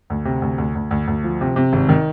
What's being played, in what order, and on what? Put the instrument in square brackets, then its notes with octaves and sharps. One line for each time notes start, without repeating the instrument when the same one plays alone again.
[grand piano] D2
C3
D2
D2
D2
D2
D2
F3
C3
C3
G#1
D#3